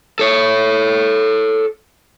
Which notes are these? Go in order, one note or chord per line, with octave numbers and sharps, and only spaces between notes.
A4 C#5